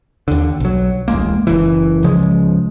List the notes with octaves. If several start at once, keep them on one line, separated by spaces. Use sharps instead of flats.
D#2 D3
B1 F#3
D1 A1 G#3 A#3
F#1 E3
C#2 C#3 F3 G#3